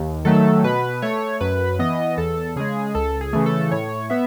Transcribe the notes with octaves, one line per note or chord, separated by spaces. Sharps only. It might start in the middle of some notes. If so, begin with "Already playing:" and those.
Already playing: D#2
D#3 F#3 A3 A4
B2 B4
A3 C#5
F#2 B4
E3 B3 D#5
E2 A4
C#3 G#3 G#4
C#2 A4
G#4
C#3 E3 A3
A4
A2 C#5
B3 E5